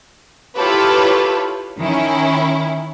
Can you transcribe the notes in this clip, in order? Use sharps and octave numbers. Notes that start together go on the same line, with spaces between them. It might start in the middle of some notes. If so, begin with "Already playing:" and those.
E4 F4 G4 A4 B4 C#5
D#3 C#4 E4